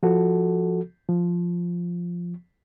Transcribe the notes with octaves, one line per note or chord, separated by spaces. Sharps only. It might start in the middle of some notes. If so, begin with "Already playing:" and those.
F3 F#4 A4
F3